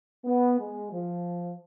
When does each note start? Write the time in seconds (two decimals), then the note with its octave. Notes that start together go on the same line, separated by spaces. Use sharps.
0.25 B3
0.59 G#3
0.92 F3